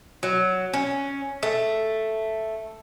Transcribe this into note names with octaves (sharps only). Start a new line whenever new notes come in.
F#3
C#4
A3